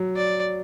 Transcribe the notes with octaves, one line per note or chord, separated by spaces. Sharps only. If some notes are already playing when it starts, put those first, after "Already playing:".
Already playing: F#3
D5